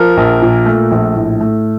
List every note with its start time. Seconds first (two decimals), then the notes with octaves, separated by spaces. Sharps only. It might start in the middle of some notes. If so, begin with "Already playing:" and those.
Already playing: F3 A#4
0.17 A#1
0.42 A#2
0.66 A3
0.91 A#1
1.15 A2
1.40 A3